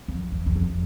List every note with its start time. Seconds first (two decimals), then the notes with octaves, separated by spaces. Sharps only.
0.08 F2
0.32 E2
0.46 E2
0.56 F2